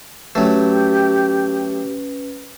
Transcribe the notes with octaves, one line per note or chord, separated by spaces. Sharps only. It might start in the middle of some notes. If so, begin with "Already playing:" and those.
F#3 A3 C#4 G4 B4